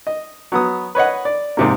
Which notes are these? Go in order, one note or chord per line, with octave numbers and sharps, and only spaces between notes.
D#5
F#3 B3 D#6
B4 C#5 D#5 F#5
D5
G#2 C3 A#3